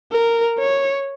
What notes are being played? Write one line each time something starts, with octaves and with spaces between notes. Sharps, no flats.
A#4
C#5